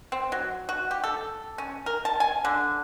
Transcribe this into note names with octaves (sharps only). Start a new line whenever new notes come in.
C4
F#3
F#4
G4
A4
C#4
A#4
A5
G#5
D3